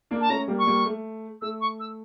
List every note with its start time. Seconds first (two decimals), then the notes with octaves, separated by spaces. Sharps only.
0.11 A#3 D4
0.20 A5
0.29 A3 C#4 A#5
0.48 G3 A#3
0.58 C#6
0.67 G3 A#3
0.86 A3
1.41 A3 E6
1.60 C#6
1.79 E6